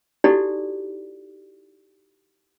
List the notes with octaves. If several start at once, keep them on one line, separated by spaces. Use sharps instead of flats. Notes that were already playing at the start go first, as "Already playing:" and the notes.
D#4 E4 F#4 G4 A4 D5